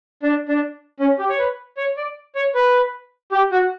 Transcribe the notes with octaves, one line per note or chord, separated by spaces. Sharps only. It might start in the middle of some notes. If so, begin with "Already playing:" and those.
D4
D4
C#4
G4
C#5
B4
C#5
D5
C#5
B4
G4
F#4